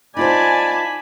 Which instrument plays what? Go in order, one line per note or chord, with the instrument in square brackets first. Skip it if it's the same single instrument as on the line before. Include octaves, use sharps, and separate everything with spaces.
[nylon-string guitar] D#4 F4 C5 [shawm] D5 [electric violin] G#5 A5 [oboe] B5